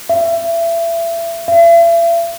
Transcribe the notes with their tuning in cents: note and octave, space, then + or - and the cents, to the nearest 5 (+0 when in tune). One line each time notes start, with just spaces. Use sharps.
E5 +30
E5 +45